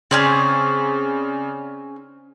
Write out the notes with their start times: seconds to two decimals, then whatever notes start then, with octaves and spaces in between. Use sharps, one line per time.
0.11 C#3 C4 C#4 G#4 D5 F6